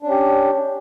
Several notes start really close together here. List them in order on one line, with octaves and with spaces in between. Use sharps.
D4 C#4 G4